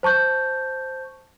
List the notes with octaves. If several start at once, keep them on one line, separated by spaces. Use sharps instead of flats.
C5 A5 C#6 G6